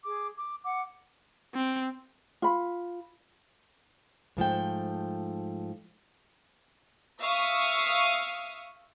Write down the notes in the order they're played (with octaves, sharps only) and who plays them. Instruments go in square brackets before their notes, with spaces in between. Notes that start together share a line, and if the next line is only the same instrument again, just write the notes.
[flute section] G#4 D6
D6
F#5 D6
[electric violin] C4
[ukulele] F4 B5
[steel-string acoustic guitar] G#2 F3 A3 G5
[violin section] E5 F5 C#6 D#6